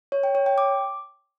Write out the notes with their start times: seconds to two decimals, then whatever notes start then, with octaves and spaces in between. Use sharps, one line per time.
0.12 C#5
0.23 G5
0.35 C#5
0.46 G5
0.58 D6